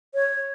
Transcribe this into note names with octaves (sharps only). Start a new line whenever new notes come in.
C#5